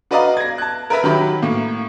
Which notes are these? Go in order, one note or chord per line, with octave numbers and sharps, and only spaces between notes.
F#4 B4 D5 D#5 F5 A#5
G#6 A#6
A5 F#6
A#4 B4 E5 A#5
D#3 F#3 G4 B5
A2 A#3